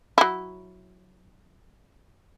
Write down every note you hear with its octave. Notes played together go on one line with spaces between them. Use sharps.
F#3 E4